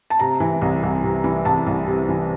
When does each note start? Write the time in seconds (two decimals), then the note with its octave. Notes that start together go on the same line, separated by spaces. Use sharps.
0.10 A5
0.19 C3 A#5
0.40 E3
0.61 C2
0.83 C2
1.04 C3
1.24 E3
1.45 C2 A5
1.67 C2
1.87 C3
2.09 E3